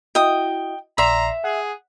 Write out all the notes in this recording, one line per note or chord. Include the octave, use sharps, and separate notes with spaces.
E4 F#4 D#5 G5 D#6
A#1 D5 E5 A#5 C6
G#4 F#5